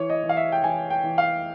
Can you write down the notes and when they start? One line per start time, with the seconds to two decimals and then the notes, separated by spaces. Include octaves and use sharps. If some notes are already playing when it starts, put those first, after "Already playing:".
Already playing: E3 C#5
0.09 D#5
0.23 E3
0.29 F5
0.37 E5
0.52 G5
0.63 E3 G#5
0.90 G5
1.04 E3
1.18 F5